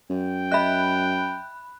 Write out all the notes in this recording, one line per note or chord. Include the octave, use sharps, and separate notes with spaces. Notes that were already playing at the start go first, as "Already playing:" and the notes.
F#2 G5
D#5 E5 B5 F#6